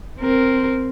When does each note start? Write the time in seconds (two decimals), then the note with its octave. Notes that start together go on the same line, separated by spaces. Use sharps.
0.19 C4 A#4